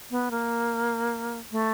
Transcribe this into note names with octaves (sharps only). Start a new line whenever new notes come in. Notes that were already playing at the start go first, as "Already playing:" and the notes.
B3
A#3
A3